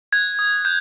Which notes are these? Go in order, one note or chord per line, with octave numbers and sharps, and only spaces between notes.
F#6 G#6
D#6
F#6 G6